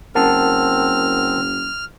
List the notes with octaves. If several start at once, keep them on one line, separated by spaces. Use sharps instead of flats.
F#1 C4 A#4 F#5 A5 F6